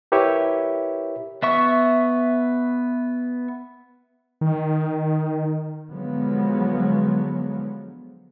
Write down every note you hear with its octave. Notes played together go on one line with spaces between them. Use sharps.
E4 G4 A#4 B4 C#5 E5
B3 E5 C#6
D#3
D3 F3 F#3 G#3 B3